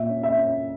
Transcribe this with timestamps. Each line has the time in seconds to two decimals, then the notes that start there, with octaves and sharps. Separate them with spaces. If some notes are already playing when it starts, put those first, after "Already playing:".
Already playing: A#2 E5
0.09 C#4
0.23 E5
0.37 C#4